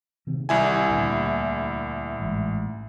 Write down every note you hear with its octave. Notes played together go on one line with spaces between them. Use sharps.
C3 D#3 C4
C2 E4 G#5
D2 A#2 D3
A1 G#2